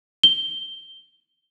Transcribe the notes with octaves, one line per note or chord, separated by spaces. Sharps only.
G7